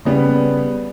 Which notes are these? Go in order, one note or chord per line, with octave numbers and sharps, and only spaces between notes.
C#3 G3 B3